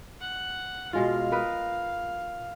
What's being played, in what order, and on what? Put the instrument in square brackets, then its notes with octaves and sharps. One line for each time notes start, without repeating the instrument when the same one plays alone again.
[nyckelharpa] F#5
[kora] B2 G#3 F4 [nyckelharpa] F5
[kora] A#4 B4 D#5